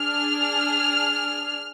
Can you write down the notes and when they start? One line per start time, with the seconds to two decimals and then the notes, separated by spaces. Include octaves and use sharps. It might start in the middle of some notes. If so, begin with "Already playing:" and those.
Already playing: D4 G#4 F6